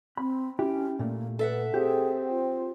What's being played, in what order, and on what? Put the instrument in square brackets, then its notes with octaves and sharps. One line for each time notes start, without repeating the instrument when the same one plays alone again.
[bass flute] C4 [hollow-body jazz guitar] B5
[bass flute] C#4 [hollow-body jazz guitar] E4 G4
[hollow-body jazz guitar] A#2 A3 [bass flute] A#3
[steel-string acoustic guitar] A4 E5 F#5 [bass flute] B4
[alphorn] C4 [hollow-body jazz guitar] G4 [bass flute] G#4
[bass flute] F4